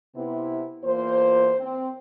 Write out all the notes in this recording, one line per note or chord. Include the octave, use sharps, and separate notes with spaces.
C3 B3 E4
E2 A#3 F4 C5
C4